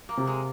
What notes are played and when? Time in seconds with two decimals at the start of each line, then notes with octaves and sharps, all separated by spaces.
0.09 A#3
0.17 C3
0.27 G#3